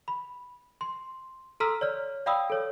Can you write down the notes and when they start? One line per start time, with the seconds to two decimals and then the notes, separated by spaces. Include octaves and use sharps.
0.08 B5
0.81 C6
1.60 A4 A#5 C6 E6 F6 B6
1.81 C#5 D5 F6
2.26 D5 F5 G5 B5 D#6 E6
2.50 A4 C#5